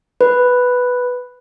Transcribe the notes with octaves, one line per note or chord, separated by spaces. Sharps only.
B4